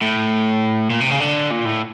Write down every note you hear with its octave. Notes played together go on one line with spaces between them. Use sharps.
A2
A#2
C3
C#3
D3
A#2
A2